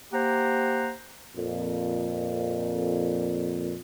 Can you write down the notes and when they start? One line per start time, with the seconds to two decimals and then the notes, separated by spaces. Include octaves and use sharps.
0.13 A#3 G4 C5 F#5 A#5
1.36 F2 A#2